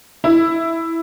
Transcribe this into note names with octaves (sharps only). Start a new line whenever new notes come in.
E4